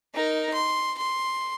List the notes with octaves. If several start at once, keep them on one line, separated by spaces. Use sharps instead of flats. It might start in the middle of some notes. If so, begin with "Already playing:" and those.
D#4 A#4
C6
C6